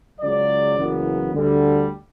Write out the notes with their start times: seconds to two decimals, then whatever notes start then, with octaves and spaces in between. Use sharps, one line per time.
0.19 C#2 C#3 F#3 D5
0.75 F#1 F#2 C#3 E3 B3
1.31 D2 D3 G3